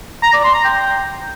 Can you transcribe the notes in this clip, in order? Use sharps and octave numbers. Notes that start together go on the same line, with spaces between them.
A#5
D5
C6
A#5
G5